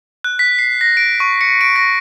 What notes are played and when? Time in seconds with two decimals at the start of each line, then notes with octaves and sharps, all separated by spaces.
0.24 F#6
0.39 B6
0.59 C7
0.81 A#6
0.97 D7
1.20 C#6
1.41 C#7
1.61 D7
1.76 A#6